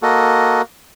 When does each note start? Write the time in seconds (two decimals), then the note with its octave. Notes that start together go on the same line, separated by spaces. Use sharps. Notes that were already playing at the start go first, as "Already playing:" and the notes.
0.02 A#3 F#4 A4 D#5